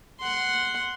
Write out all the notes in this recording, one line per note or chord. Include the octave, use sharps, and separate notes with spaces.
F#5 C6